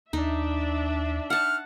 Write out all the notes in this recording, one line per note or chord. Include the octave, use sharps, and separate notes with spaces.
D#2 D4 D#4 E5
F#5 A5 F6